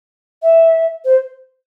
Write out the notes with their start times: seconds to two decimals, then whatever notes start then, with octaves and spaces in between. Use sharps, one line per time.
0.42 E5
1.04 C5